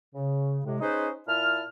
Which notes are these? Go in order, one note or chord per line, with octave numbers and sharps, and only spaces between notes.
C#3
A2 C3 G#3
C#4 D#4 G#4 B4 C5
A#2 E4 A5 F6